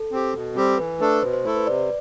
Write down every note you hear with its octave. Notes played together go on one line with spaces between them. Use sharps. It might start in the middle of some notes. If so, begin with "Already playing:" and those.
Already playing: A4
C4 G4
B2
G3 C4 G4
E3 B4
A3 D4 A4 B4
B2 C5
C5
A3 E4 A4 C5
B4
C3 D5